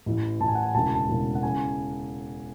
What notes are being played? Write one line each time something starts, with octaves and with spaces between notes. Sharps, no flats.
A1 A2 E3
A1 A2 E3 A5
G#5
F#5
G#5
E1 D2 C#3 E3 A5
A5
E1 D2 C#3 E3
F#5
C#3 E3 G#5